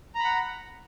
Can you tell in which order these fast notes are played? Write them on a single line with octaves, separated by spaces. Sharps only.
A#5 B5 F#5